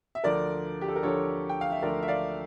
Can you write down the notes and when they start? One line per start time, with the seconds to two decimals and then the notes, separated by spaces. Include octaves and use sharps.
0.15 E5
0.24 D2 D3 F3 A3 A#4 D5
0.81 G4
0.88 A4
0.96 A#4
1.02 D2 D3 F3 A3 A4 C#5
1.49 G5
1.61 F5
1.72 E5
1.82 D2 D3 F3 A3 A#4 D5
2.02 E5
2.08 D5 F5